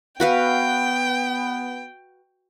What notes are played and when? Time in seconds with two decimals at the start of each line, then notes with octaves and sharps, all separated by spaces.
0.20 B3 F#4 B4 F5 G5